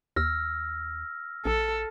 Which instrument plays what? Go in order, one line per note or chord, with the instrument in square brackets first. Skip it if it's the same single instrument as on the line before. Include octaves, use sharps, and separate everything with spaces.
[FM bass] D#2 [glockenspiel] E6 F6 A#6
[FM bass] A#1 [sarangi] A4